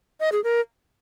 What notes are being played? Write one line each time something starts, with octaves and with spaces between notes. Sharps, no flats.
D#5
G#4
A#4